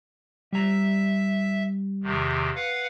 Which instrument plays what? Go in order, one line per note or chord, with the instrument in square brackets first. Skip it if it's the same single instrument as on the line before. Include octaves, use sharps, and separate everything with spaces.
[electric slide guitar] G3 A#5 [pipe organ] E5
[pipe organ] E2 C3 D#3
B4 F5 F#5